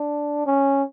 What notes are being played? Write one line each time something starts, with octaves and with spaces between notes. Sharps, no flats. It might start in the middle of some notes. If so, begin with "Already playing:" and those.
Already playing: D4
C#4